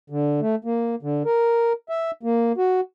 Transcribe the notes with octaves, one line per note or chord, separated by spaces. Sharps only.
D3
A3
A#3
D3
A#4
E5
A#3
F#4